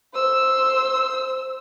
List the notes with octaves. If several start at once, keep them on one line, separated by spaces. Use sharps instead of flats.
C5 E6